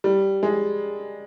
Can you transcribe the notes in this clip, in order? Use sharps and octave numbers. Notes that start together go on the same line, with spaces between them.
G3
G#3